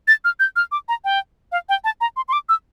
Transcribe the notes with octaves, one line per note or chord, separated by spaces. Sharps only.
A6
F6
G6
F6
D6
A#5
G5
F5
G5
A5
A#5
C6
C6
D6
E6